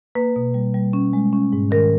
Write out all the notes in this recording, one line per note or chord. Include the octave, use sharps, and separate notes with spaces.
A#3 B4
B2
G3
G3
C#4
G#3
C#4
G#2
D#3 A#4